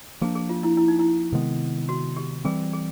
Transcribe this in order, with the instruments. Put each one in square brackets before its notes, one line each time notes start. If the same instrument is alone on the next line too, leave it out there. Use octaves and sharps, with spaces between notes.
[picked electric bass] F3 A#3 D4 [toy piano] G#4
[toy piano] G#4
F4
E4
E4
D#4
E4
[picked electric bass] C3 D#3 G#3 B3
[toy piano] F#4
G4
[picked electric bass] E3 G3 C4 [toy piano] G#4
[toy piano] G#4